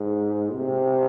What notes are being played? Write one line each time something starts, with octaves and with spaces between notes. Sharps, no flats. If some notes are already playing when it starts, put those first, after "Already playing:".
Already playing: G#2
C3